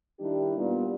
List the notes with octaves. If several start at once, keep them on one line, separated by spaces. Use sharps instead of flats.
D#3 G3 D4 E4 G4
A#2 G3 B3